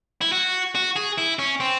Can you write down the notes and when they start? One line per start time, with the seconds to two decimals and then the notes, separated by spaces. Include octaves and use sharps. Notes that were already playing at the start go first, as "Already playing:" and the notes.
0.21 E4
0.32 F#4
0.75 F#4
0.96 G#4
1.18 E4
1.39 C#4
1.60 C4